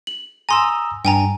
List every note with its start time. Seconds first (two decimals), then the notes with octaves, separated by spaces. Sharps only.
0.07 F#7
0.49 G#5 A#5 C6 D#6 E6 E7
1.05 G2 G5 G#5 A#5